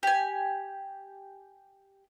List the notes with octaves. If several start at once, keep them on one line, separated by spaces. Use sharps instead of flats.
G4 G#5